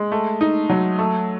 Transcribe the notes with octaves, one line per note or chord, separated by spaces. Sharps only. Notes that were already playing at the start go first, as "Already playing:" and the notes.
Already playing: G#3
A3
D#4
F#3
A3